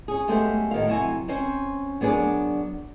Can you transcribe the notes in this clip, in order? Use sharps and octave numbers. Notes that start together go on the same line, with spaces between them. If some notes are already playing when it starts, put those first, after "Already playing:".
C#4 G#4
F#2 G#3 A3 B3 G4 C5
A2 D#3 B3 F5
C3 F#3 E4 F#4 G#5
C4 C#4 C5
F#3 B3 D4 G#4 A#4 D5